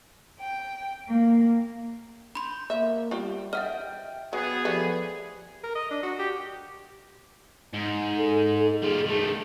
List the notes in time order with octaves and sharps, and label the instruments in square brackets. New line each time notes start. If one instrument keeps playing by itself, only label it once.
[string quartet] G5
A#3
[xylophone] B5 C6 [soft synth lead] G6
[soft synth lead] A#3 [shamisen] E5
[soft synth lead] G3 [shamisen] F4 G4
[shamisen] D#5 [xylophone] E5 F#5 F6 [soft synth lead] G5
[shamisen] F#3 [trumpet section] B3 G#4
[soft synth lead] F3 [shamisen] G3 A3 B4
[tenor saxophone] A#4
D#5
D4
F#4
G4
[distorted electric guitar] G#2
[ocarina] A4
[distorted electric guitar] G3 F4 [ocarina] G#4
[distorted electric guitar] D#3 A3 [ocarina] G#4